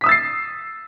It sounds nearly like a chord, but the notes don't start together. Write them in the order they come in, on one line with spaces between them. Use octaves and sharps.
B6 D#6 E6 A6 C7